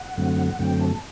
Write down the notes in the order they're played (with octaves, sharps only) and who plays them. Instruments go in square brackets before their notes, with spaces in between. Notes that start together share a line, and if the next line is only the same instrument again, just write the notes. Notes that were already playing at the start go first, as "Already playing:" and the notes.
Already playing: [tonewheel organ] F#5
F#2 D3 F#3 A3 C4
F#2 D3 F#3 A3 C4 G5
A5